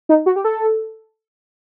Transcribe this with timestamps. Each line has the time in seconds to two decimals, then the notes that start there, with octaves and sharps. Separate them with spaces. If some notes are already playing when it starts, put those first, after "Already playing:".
0.09 D#4
0.26 F#4
0.36 G4
0.44 A4